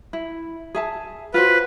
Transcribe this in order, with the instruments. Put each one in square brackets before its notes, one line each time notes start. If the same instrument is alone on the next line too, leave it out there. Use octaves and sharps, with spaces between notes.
[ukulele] E4
G#4 E5 A5
[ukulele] F4 F#4 C5 [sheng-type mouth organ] B4